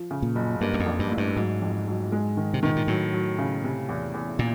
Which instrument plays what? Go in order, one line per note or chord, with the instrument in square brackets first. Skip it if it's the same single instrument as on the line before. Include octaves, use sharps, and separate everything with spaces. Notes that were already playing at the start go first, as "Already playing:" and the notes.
Already playing: [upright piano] F3
C#3
[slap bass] A#2
[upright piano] F#1
[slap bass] G2 [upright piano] A#3
[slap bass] F#2
F2
[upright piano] A#1
[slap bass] G2
[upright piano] A2
[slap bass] G2
[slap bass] G#2 [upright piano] F#3
[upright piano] F2
F#3
G#3
D#3
[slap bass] C3
[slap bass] B2 [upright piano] D#3
[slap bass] A#2
[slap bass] A2 [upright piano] F#3
[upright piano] F#3
C#3
C3
E2
E2
[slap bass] A#2